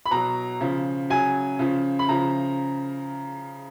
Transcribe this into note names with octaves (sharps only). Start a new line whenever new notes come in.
B5
B2 F#3 A#5
C#3 F3
C#3 F#3 G#5
C#3 F3
B5
C#3 F3 A#5